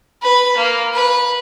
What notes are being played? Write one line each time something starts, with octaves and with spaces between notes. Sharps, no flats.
B4
A#3
B4